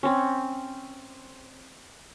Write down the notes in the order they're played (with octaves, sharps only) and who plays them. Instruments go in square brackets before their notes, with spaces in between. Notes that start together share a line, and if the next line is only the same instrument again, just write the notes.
[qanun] C4 C#4